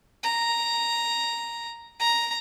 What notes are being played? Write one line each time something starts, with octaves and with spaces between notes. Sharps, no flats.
A#5
A#5